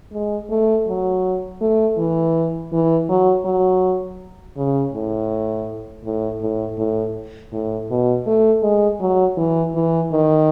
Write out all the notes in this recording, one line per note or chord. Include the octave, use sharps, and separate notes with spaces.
G#3
A3
F#3
A3
E3
E3
F#3
F#3
C#3
A2
A2
A2
A2
A2
B2
A3
G#3
F#3
E3
E3
D#3